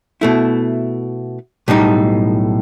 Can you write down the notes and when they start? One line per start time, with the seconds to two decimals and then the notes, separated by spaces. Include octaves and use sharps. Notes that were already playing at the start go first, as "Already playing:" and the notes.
0.21 B2 A3 E4
1.68 B1 A2 G3 D#4